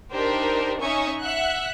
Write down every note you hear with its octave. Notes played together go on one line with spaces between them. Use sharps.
D4 D#4 G4 A#4 C5
C#4 D#4 E5 G#5 C#6 D#6
E5 F#5 F#6